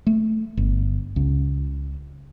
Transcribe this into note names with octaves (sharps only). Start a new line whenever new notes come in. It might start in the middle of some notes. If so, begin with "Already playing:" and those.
A3
G1
C#2